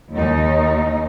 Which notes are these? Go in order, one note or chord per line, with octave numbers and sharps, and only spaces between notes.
D#2 D#4